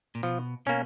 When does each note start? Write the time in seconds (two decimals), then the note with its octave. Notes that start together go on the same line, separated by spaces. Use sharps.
0.15 A#2
0.23 B2 F3
0.66 B2 A#3 C#4